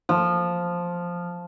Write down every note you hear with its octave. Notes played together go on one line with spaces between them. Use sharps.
F3